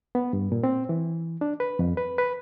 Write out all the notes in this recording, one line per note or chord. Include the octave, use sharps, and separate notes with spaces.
B3
G2
A#2
C4
E3
D4
B4
F2
B4
B4